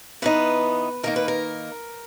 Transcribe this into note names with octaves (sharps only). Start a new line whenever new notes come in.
E3 B3 D#4 B4
D#3 A#3 D#4 A#4
B4
A#4